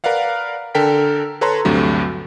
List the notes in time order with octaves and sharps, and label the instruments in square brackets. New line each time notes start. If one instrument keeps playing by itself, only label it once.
[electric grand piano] A#4 B4 D5 F5 F#5
D3 A4 A#4 G5 B6
A4 B4 C#5 A5 A#5 C6
D2 G2 C3 F#3 A3